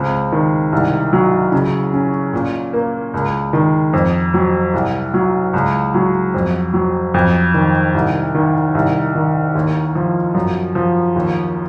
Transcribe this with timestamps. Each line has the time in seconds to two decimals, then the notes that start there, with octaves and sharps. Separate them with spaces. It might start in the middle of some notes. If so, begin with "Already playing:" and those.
Already playing: C#2 C4
0.32 D#3
0.72 C2
1.13 F#3
1.52 C#3
1.93 C#4
2.33 A#2
2.73 A#3
3.14 C#2
3.53 D#3
3.93 F2
4.34 F#3
4.74 C2
5.14 F#3
5.53 C#2
5.94 F#3
6.34 F2
6.74 F#3
7.14 F2
7.54 D#3
7.94 C2
8.35 D#3
8.75 C2
9.15 D#3
9.55 D#2
9.95 F3
10.35 F#2
10.75 F3
11.16 D#2